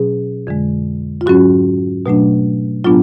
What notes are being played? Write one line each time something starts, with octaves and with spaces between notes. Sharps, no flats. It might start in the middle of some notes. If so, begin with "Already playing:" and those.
Already playing: B2 F#3 C#4 G#4
F2 D3 G#3
F4
G#2 F#3 C#4 F#4
B2 F#3 A3 D4
A2 F#3 B3 D4 F4